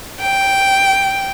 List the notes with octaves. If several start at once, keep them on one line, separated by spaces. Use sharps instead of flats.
G5